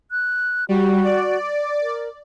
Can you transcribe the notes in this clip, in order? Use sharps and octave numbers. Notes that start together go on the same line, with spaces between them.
F#6
G3 F#4
D5
A#4